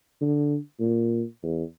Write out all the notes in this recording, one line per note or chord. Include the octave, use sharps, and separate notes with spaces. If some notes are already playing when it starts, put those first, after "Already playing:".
D3
A#2
E2